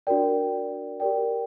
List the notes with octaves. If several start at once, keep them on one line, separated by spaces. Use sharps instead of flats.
D4 F#4 A#4 D5 G5
G4 A#4 D5 G5